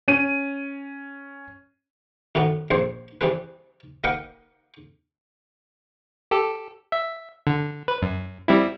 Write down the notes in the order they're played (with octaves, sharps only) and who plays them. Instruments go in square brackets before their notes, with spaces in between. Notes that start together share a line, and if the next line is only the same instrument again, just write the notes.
[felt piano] C#4 D#7
[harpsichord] F#2 A2 D#3 B3
A#1 C4 C5 C#5
E3 G3 C4 G#4 B4
A#3 D#4 A#4 B4 F#5 G5
[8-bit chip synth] G4 A4
E5
D3
B4
F#2
G3 C4 E4